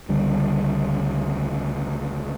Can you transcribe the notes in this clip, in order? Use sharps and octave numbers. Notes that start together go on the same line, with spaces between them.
C#2 D3 G3